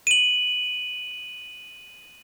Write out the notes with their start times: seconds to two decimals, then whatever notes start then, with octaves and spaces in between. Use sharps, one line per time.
0.07 D#7 F#7